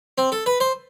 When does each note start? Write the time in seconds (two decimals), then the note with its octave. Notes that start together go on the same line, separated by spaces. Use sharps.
0.18 C4
0.32 A4
0.46 B4
0.60 C5